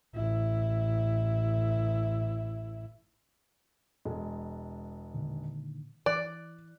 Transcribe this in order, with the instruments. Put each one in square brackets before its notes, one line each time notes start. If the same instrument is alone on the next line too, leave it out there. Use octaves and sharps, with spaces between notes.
[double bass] A1 E4
[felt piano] E1 G#3
[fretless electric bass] A#2 D3 D#3
[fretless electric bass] E3 [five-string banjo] D5 [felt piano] F#6